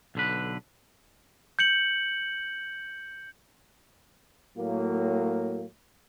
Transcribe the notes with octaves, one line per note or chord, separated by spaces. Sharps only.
B1 D3 B4
G6 C#7 F#7
A2 F#3 A#3